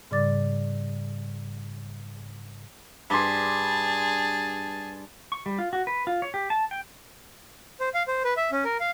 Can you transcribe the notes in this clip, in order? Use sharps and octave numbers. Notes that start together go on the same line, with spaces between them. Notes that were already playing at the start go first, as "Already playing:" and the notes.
G#2 C#3 G3 D5 D6 A6
G2 G#4 A5 C6
C#6
G3
F4
F#4
B4
F4
C#5
G4
A5
G5
C5
F5
C5
B4
E5
C#4
A#4
F5